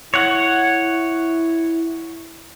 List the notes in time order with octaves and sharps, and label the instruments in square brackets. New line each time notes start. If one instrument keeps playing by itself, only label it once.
[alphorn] E4 [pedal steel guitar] C#5 F#5